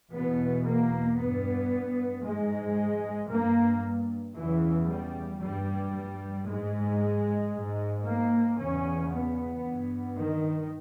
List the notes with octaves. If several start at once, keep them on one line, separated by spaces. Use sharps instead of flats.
E2 B2 B3
A#3
G2 B3
G#2 G#3
G2 A#3
E2 C#3 E3
G3
G2 G3
G#2 G#3
G#2
A#3
E2 C#3 C#4
B3
G2
D#3